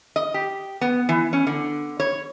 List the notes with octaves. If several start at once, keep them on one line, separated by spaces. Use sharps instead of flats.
D#5
G4
B3
E3
C#4
D3
C#5